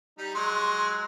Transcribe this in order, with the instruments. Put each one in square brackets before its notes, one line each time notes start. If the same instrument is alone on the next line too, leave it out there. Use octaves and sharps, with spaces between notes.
[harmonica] G3 D#4
[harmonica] F#3 G#3 [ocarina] C6